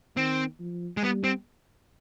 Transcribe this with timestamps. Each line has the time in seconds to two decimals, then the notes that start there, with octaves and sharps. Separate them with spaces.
0.16 D#3 C4
0.59 F3
0.97 G#3
1.02 G3 B3
1.24 C4